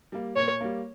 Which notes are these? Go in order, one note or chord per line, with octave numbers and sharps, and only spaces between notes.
G3 A#3
A#2 C#5
G3 A#3